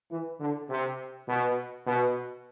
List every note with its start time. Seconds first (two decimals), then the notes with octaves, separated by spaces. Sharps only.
0.11 E3
0.40 D3
0.70 C3
1.28 B2
1.86 B2